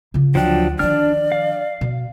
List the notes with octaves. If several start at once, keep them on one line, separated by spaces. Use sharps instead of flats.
C#3 F4
D2 F3 F#3 D4 G5
D#3 F3 D4 D5 F6
F5
B2